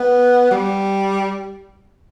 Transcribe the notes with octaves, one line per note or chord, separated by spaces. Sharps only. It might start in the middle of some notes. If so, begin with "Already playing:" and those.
Already playing: B3
G3